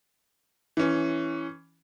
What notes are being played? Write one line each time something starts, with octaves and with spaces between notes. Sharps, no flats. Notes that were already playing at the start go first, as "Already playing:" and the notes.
E3 C#4